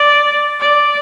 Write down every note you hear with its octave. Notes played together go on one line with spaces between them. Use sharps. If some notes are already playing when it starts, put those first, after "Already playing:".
Already playing: D5
D5